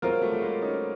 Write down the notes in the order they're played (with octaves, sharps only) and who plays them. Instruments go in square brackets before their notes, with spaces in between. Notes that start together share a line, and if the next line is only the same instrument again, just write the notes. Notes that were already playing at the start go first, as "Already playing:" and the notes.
[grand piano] F#3 G#3 [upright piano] C4 F4 A#4
[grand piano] G3 A3
A3
G#3 A#3
C#4 D#4